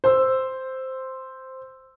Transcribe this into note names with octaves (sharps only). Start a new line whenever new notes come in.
C5 C6 E6